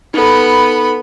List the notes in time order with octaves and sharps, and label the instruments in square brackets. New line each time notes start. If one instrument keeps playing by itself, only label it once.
[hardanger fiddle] B3 B5 [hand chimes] D#4 A4